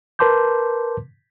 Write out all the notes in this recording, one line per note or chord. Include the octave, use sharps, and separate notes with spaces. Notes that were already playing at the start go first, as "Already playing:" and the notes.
A#4 B4 A5 C6 D6 G6